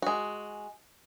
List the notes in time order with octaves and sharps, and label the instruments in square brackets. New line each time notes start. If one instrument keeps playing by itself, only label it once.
[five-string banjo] G#3 F#4